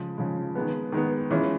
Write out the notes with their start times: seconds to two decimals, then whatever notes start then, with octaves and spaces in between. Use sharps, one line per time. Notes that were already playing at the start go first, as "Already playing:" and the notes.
Already playing: C#3 F3 G#3
0.18 C#3 F3 G#3
0.55 D#3 G#3 B3
0.92 D#3 G#3 B3
1.31 E3 G#3 C#4 F4